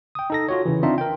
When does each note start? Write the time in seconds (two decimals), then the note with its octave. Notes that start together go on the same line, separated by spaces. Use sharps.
0.15 G5 D#6
0.30 D#4 A4 A#6
0.48 F4 F#4 C#5
0.66 C#3 E3
0.83 C4 D4 D#4 F4 E5
0.98 A#4 G5